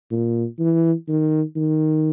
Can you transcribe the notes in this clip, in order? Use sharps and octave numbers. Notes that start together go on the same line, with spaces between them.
A#2
E3
D#3
D#3